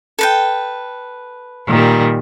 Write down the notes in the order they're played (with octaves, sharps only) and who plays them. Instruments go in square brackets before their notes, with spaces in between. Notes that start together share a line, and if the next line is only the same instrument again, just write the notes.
[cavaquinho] A4 B4 G5
[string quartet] A#2 D#3 G3